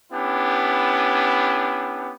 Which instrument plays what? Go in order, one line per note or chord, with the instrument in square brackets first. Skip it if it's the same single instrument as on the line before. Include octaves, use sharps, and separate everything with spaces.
[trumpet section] B3 C#4 D4 E4 G4